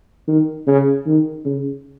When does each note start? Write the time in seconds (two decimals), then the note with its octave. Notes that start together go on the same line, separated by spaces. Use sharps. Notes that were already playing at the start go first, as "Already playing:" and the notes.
0.28 D#3
0.67 C#3
1.06 D#3
1.45 C#3